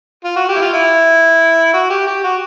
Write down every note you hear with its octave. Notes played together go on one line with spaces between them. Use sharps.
F4
F#4
G4
E4
F4
E4
F#4
G4
G4
F#4